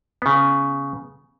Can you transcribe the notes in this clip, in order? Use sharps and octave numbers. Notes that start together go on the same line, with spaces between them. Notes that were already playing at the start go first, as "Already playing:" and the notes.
C#3 B3